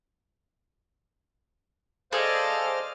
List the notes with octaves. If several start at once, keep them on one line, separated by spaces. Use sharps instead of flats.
G#4 A4 C5 D5 D#5 F5 F6